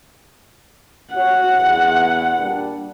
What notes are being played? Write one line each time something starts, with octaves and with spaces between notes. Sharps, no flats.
F#4 C#5 F#5
E2
A#2 G3 D4